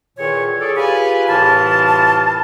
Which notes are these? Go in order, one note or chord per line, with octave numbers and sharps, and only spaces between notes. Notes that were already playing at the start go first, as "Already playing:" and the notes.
E2 A#2 D#3 C#5
G#4 A4 C#5 D5
F4 G4 G#4 B4 G#5
C2 A2 E3 F4 A5